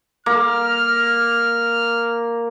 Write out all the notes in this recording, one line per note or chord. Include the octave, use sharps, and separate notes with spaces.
A#3 F6